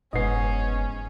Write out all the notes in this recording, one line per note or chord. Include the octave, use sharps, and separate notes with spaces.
F#1 G#2 B3 C#4 D#5 C7